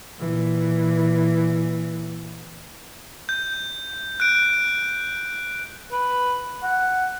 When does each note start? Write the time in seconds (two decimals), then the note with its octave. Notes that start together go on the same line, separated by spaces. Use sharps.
0.18 A#2 E3
3.29 G6
4.20 F#6 D7
5.92 B4
6.63 F#5